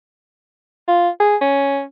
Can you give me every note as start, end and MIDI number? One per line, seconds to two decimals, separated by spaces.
0.88 1.09 65
1.20 1.36 68
1.41 1.82 61